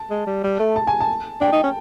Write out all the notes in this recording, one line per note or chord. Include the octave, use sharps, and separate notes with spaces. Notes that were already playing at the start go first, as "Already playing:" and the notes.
Already playing: A5
G#3
G3
G3
A3
A5
G#5
A5
D4 G5
D#4
C#4